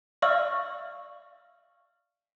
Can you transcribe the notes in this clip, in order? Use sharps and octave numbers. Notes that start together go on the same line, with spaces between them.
D5 E5 F5 C#6 E6 F6